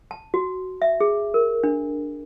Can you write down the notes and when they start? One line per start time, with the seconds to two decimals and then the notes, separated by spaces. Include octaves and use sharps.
0.11 A5
0.34 F#4
0.82 E5
1.01 G#4
1.34 A#4
1.64 D4